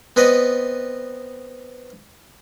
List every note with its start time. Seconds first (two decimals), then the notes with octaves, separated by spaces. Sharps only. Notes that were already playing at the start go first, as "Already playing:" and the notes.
0.16 B3 C4 B4 D5 D#5